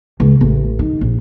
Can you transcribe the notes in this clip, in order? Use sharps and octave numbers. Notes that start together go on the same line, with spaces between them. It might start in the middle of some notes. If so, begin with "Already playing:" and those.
C#2
A1
D#3
A#1